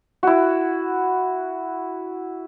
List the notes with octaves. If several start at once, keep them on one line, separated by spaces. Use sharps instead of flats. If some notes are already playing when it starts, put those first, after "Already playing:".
E4 F#4